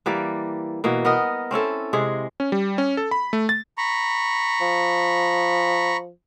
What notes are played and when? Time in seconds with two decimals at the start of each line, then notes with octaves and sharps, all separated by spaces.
0.06 E3 G3 A#3 D5
0.84 B2 E3 A#3
1.05 B3 A#4 D#5
1.51 C4 C#4 E4 A4
1.93 C3 G#3 G#4
2.40 C#4
2.52 G3
2.78 C#4
2.97 A4
3.11 B5
3.33 A3
3.49 A6
3.78 A#5 B5 C#6
4.61 F3